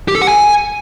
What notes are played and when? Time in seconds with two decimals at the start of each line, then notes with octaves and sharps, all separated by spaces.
0.08 G4
0.15 A4
0.22 F#5
0.28 G#5